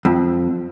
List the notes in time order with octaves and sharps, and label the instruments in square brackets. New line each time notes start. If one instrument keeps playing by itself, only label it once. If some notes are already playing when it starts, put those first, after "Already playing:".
[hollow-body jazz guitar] F2